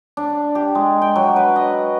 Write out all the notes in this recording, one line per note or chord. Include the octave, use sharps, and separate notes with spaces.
D4
G4
G#3
G5
F#3
B4
D#5